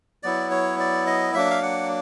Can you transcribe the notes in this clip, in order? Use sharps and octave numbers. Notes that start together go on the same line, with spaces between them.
F#3 B3 E4 D5
C#5
D5
D#5
F#3 A#3 D4 E5
F5
F#5